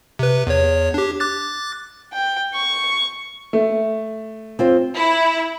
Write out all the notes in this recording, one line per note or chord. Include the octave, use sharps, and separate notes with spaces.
C3 B4
E2 C#5
D4 G4
D6 F#6 A6
G5
C#6
A3
C4 F4 C5
E4